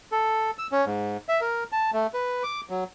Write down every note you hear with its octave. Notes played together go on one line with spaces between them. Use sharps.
A4
E6
C#4
G#2
E5
A#4
A5
A3
B4
D6
F#3